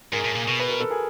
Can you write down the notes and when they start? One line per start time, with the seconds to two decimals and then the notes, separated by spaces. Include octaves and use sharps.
0.13 G#2 G#4 A#4
0.25 A2
0.36 A#2
0.48 B2
0.60 B4
0.69 A#4
0.80 A4
0.90 G#4 A#4